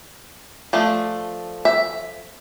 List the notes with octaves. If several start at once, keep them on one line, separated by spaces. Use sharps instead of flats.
F3 A3 D4
E5